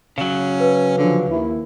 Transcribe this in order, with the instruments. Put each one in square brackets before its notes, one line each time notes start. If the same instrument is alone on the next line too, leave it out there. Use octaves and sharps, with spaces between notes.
[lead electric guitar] C#3 F#3 [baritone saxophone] C#4
[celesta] B4
[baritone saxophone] D3 [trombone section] F3 C#4
[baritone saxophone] D#2 [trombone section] A#3 E4